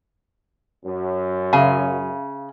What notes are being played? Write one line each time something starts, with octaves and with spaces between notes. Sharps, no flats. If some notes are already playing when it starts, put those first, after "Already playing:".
F#2
C#3 E5 F5 G#5